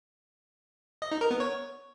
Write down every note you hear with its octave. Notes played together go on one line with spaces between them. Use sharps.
D#5
D#4
A#4
B3
C#5